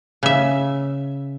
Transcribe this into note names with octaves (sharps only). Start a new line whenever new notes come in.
C#3 E5